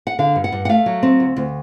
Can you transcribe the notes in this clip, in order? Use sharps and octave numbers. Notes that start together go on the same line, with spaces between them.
F#5
D3 F5
G2
F#5
G2
F#5
A3 F5
F#3
C4
D2
D2